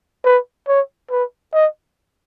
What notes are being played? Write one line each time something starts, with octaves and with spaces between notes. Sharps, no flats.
B4
C#5
B4
D#5